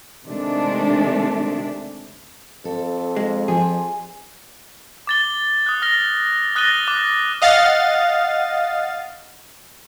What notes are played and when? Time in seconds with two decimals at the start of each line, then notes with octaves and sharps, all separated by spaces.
0.24 C3 D#3 G#3 A3 D4
2.65 F2 A4
3.16 G#3
3.48 F3 G#4
5.07 D6 A6 G7
5.66 D#6 F#6
5.82 F6 A#6 G7
6.56 D#6 F#6 A6 A#6 D#7 G7
6.87 D6 F#6
7.42 D#5 F5 F#5 A6